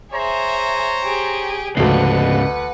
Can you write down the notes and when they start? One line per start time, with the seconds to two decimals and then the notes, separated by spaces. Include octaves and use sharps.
0.12 G#4 C5 C#5 E5 A#5
1.03 G4 G#4
1.77 D2 G#2 C#3 D4 B4 D#5 F#5 C7